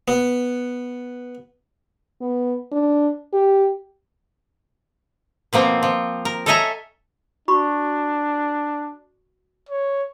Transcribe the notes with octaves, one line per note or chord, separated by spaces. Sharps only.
B3
B3
D4
G4
B2 F3 A#3 C4
F3
A#4
A4 C#5 D#5 E5 G#5 A#5
D4 F#4 B5 C#6
C#5